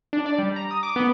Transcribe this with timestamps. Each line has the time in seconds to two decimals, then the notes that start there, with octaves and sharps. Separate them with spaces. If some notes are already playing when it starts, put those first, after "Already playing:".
0.13 D4
0.26 D5
0.38 G3
0.56 A#5
0.71 D#6
0.83 D6
0.96 B3